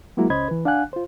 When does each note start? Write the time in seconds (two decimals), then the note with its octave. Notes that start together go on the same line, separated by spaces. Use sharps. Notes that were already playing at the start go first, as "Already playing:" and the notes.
0.17 F#3 G#3 A#3 E4 F#4 A#4
0.30 C#2 C#4 C5 D#5 B5 G#6
0.49 E3 B4
0.65 D4 F5 F#5 G#5 F#6
0.93 F4 C5